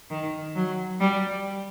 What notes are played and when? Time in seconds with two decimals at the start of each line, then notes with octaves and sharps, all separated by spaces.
0.10 D#3
0.55 F#3
1.00 G3